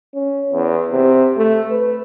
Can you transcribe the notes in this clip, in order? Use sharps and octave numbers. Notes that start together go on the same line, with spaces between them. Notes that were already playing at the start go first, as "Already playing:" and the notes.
C#4
E2
C3
A3
B4